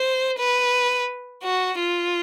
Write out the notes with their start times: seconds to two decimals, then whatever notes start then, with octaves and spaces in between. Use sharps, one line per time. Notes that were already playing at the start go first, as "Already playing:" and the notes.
Already playing: C5
0.38 B4
1.43 F#4
1.78 F4